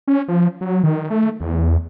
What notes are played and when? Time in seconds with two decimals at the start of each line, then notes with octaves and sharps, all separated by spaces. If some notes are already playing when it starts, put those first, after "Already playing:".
0.08 C#4
0.28 F3
0.61 F#3
0.83 D#3
1.10 A3
1.40 E2